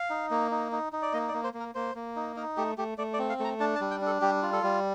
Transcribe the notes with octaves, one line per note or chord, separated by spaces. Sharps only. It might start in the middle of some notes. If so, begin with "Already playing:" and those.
Already playing: F5
D#4
A#3
D#4
D#4
D#4
D5
A#3 D#5
D5
A#3
C5
A#3
A#4
A#3 C5
A#3
D#4
D#4 A#4
A3 G4
A3 G4
A3 D5
D5
C4
F5
A3 A#5
D4 A5
A5
G3
G5
D4
A4
G3 G4
F4
A4
G3